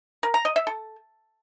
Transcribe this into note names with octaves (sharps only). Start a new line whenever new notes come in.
A#4
A#5
D#5
E5
A4